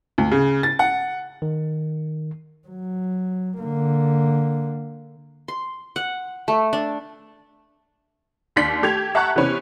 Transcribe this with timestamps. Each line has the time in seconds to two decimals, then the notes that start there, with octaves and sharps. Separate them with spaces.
0.18 D2
0.31 C#3
0.63 A6
0.79 F#5
1.42 D#3
2.68 F#3
3.59 D3 A#3
5.48 C6
5.96 F#5
6.48 A3
6.73 D4
8.56 D#2 D4 C6 B6 F#7
8.83 A3 G4 G6 G#6 F7
9.15 E5 F#5 A5 A#5 C#6 F#6
9.36 C3 E3 B3 C#4